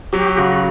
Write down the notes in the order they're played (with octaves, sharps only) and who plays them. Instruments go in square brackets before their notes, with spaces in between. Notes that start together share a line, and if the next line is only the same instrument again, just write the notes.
[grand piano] F#3 [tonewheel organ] G4
[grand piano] C#3 [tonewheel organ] F#4